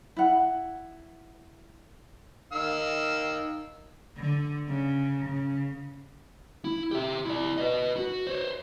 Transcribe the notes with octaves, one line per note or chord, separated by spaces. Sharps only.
E4 F#5
D#3 F5 E6
D3
C#3
C#3
E4
G4 E5
E4 D5
B4 D#5
F#4
C5 C#5